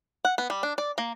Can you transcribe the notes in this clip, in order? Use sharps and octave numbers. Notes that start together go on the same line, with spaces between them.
F#5
B3
G3
D4
D5
A#3